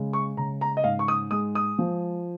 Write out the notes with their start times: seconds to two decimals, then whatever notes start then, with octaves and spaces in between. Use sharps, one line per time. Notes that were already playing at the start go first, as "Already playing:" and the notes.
Already playing: C#3 G#3
0.13 C#6
0.37 C#3 A#5
0.61 A#5
0.77 D#5
0.84 G#2 F5
0.99 C#6
1.08 D#6
1.31 G#3 D#6
1.55 D#6
1.79 F3